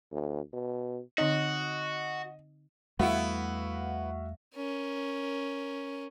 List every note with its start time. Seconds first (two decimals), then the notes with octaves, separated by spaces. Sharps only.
0.12 D2
0.53 B2
1.18 D3 C4 D#4 F#4 D#5
2.99 E2 G3 A3 B3 E4 F#4 E5 F5
4.56 C#4 A#4